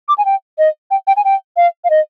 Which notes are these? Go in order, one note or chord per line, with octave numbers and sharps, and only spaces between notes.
D6
G#5
G5
D#5
G5
G5
G#5
G5
F5
F5
D#5